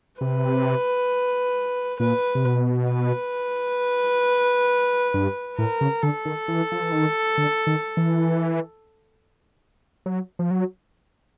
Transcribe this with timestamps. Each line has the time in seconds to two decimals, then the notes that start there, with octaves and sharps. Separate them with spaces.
0.21 C3 B4
2.00 A#2 B4
2.35 C3
2.45 B2
2.90 B4
5.14 G2
5.58 A2 A#4
5.81 C#3
6.03 D3 A4
6.25 D#3
6.48 E3
6.72 F3
6.82 E3
6.92 D#3
7.37 D3
7.67 D#3
7.97 E3
10.06 F#3
10.39 F3
10.51 F#3